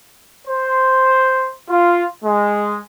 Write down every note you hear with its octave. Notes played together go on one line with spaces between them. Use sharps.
C5
F4
G#3